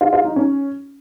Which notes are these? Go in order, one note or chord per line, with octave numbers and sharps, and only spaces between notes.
F4
F4
D#4
C#4